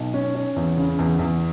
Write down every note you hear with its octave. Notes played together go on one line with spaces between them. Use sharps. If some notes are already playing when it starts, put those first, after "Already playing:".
Already playing: B1
C#4
C#4
E2
C#3
E2
E2